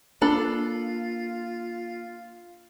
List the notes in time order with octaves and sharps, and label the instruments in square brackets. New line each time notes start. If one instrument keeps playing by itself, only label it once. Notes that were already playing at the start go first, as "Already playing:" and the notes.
[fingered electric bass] A#3 [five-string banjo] D4 A4 B5 [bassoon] F4